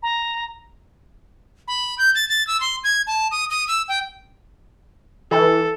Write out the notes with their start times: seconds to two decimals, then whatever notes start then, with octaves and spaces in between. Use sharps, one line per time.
0.03 A#5
1.68 B5
1.98 G6
2.15 A6
2.29 A6
2.47 E6
2.61 C6
2.84 G#6
3.07 A5
3.31 D#6
3.50 D#6
3.68 E6
3.88 G5
5.31 E3 A4